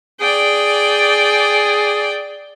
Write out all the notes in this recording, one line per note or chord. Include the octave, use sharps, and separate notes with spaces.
G#4 D5 G5